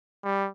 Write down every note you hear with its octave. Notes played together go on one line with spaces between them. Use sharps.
G3